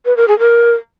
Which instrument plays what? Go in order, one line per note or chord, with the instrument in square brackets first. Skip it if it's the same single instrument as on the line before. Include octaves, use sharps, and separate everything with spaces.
[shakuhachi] B4
A#4
G#4
A#4